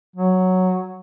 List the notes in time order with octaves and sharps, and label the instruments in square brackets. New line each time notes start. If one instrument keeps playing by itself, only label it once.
[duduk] F#3